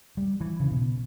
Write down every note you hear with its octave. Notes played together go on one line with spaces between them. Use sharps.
G3
E3
C#3
B2